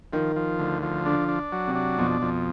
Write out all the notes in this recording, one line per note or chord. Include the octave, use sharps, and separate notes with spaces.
D#3 F3
F3
D2
F3
D3 D4
D4
F#3
C3
D4
F2 B2
F2